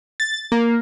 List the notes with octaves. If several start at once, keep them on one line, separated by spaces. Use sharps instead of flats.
A6
A#3